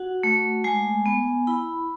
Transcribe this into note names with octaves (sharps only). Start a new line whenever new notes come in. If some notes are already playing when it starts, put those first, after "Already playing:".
Already playing: F#4 F#5
A3
G#3 G#5
B3
E4 B5